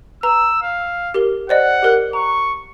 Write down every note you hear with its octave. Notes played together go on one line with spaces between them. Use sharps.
B4 A#5 E6
F5
G4 A#4 G7
C5 D5 D#5 F#5
G4 A#4 F#6
A#5 C#6